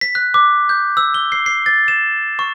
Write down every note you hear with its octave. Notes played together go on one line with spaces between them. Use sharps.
B6
F#6
D6
G6
E6
G7
C7
C7
A6
E7
C#6